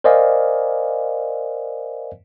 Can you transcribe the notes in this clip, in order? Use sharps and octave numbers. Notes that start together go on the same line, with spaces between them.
A#4 C5 D5 D#5 F5 G#5